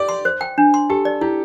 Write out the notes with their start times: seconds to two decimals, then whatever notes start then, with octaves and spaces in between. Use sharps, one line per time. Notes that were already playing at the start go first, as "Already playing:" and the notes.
Already playing: G4 D5
0.09 C6
0.25 C5
0.41 G5
0.58 D4
0.74 C6
0.90 G4 A4
1.05 D5
1.21 E4 G4